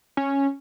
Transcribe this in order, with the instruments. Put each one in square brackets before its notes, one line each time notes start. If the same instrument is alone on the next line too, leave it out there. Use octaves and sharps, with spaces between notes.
[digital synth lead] C#4